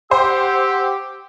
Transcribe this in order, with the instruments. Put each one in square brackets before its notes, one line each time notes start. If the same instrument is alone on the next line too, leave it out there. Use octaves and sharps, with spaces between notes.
[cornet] G4 [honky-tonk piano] C5 [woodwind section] F#5 E6